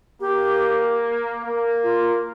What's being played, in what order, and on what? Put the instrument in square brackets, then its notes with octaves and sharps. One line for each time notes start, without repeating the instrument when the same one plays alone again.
[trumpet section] A#3 [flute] G4
[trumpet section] A#3
[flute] F4